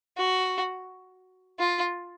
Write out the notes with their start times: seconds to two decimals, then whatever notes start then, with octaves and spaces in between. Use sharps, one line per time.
0.17 F#4
1.59 F4